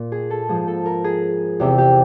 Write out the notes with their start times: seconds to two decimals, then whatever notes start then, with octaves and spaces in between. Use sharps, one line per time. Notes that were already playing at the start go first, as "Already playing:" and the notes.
Already playing: A#2
0.12 G#4
0.30 A4
0.49 G#2 F3 G#4
0.67 A4
0.86 A#4
1.04 G#4
1.60 E2 C3 E3 G4
1.78 G4